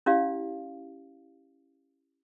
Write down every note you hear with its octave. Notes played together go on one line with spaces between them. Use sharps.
C#4 E4 G4 D5 F5